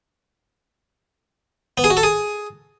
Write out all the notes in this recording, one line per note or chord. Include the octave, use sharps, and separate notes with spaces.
B3
G#4
F#4
A4
G#4